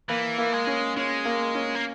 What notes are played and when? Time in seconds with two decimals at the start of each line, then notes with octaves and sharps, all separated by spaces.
0.09 E3 A#3
0.38 A#3
0.53 G#3
0.67 C#4
0.96 G#3 C#4
1.25 A#3
1.55 C#4
1.75 A#3